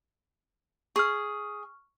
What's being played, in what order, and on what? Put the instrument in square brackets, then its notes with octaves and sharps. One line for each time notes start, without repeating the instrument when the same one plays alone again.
[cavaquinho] G#4 [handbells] C#6 F6